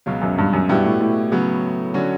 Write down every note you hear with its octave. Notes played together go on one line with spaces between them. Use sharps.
C#2 B2 F#3
F#2
G2
F#2
G2 B2 G3 B3 E4 G4
A2
A2
C#3 F#3 B3
D3 F#3 C#4 F#4